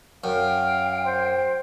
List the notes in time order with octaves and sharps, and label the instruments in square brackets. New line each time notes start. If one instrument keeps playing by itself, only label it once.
[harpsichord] F#2 [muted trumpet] F5 [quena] G5
[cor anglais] C5